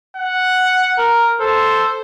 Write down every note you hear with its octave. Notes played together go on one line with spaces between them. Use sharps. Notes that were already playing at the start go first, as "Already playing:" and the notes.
F#5
A#4
A4 C5